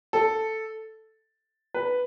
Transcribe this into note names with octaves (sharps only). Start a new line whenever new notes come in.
A4
B4